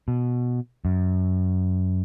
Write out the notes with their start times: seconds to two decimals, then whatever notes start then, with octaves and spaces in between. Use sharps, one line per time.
0.08 B2
0.85 F#2